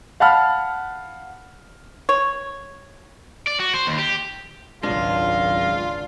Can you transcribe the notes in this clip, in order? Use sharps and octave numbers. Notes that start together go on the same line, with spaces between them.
F5 F#5 A5 B5 F6
C#5
D5
F#4
C5
D#2
G4
G#1 C#2 F#2 G#3 D4 F4 F5